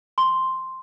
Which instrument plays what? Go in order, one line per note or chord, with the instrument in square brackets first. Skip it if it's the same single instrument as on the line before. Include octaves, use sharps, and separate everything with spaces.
[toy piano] C6